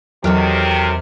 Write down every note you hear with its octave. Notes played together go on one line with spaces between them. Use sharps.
E2 C3 D#3 F#3 A4 C#5 F6